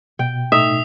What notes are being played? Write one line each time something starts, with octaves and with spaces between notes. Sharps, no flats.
B2 G5
A2 A3 D#4 E5 D#6